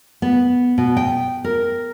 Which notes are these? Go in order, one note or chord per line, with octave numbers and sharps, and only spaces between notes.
B3
B2
G5
A#4